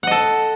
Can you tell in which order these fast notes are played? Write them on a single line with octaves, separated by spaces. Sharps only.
F#5 D#5 A4